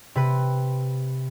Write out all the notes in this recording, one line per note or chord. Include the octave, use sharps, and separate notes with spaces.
C3 B4